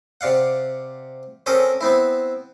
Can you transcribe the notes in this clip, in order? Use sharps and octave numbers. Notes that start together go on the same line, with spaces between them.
C3 D5 F5 F#5
C4 C#4 A4 A#4 D#6
B3 C4 E4